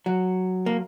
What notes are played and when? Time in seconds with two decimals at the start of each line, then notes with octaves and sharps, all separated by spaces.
0.06 F#3
0.66 A#3